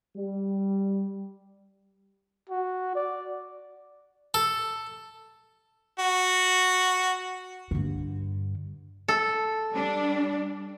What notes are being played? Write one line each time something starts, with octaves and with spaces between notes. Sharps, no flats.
G3
F#4
D5
A4
F#4
G2 D3
A4
G3 D4